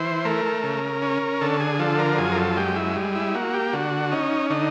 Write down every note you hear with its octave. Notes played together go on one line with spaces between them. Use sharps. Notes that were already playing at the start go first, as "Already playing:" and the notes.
Already playing: E3 C5
A3 A#4
C#3
C#4
D3 A4
G#4
F3 A4
A#4
F#2 G#4
A#4
A4
G#3 G4
E4
G3
E4
A#3 F#4
G4
D3 F#4
C#4 D#4
D3 D#4